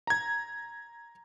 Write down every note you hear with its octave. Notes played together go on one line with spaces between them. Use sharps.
A#5 G#6